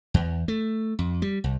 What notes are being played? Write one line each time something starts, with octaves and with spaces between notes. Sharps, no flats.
E2
A3
F2
G3
C2